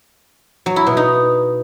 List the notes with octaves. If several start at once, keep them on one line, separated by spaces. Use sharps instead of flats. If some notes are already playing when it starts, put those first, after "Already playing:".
F#3
E4
B2
D#4